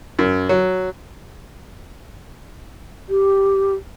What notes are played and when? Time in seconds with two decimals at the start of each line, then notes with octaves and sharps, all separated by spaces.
0.19 F#2
0.49 F#3
3.09 G4